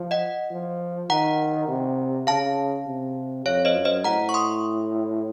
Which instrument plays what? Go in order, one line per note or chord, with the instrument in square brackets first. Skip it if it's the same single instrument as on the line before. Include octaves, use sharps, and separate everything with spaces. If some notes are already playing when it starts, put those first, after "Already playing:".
Already playing: [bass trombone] F3
[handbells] D#5 F#5
[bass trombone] F3
[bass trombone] D#3 [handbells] F#5 A#5
[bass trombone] C3
[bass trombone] C#3 [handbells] F5 A5
[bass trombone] C3
[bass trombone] F2 [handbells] C#5 F5
[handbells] C5 D#5
[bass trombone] F#2
[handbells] C5 D#5
[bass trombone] A2 [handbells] F#5 A#5
[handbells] C#6
C6 D#6